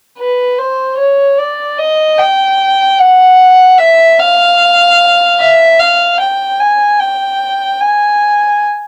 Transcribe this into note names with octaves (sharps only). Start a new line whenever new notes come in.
B4
C5
C#5
D5
D#5
G5
F#5
E5
F5
E5
F5
G5
G#5
G5
G#5